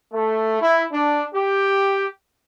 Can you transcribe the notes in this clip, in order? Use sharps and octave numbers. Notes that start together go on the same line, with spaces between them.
A3
E4
D4
G4